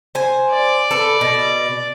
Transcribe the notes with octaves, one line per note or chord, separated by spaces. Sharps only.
C5 G#5
D5
A4 B4
B2